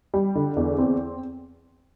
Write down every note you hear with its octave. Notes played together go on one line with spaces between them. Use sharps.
G3
D3
E2
C4